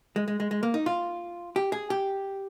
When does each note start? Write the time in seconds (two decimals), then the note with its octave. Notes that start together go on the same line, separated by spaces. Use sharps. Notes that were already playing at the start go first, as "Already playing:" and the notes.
0.16 G#3
0.28 G#3
0.40 G#3
0.51 G#3
0.63 A#3
0.74 D#4
0.86 F4
1.56 G4
1.72 G#4
1.90 G4